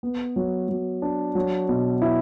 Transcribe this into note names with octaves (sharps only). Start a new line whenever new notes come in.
B3
F#3
F#3
D4
F#3
B2
E4